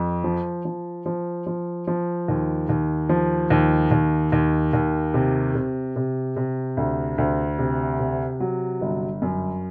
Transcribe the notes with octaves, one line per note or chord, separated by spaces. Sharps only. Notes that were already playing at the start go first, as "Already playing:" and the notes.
Already playing: F2
F3
F3
F3
F3
F3
D#2
D#2
F3
D#2
D#2
D#2
D#2
C3
C3
C3
C3
D2
D2
C3
C3
F#3
G1
F#2